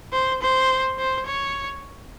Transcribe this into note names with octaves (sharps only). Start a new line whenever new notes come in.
C5
C5
C5
C#5